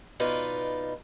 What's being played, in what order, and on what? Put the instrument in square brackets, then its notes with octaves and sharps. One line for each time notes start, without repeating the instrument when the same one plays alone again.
[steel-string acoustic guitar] B2 D#4 F4 B4 D5